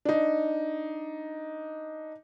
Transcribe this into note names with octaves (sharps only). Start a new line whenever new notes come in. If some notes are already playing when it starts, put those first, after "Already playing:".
D4 D#4